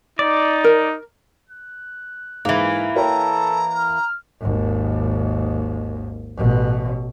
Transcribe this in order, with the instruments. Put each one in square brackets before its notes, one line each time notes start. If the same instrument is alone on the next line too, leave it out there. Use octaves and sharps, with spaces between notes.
[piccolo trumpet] D#4 [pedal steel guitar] D5
[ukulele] A#4
[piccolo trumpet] F#6
[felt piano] G#2 [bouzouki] E3 A#3
[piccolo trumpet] A4 [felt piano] A#4 C#5 G5 [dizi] A#5
[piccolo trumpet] F6
[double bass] G#1 D#2
A1 B2